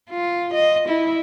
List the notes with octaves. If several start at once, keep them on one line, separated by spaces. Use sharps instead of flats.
F4
D#5
E4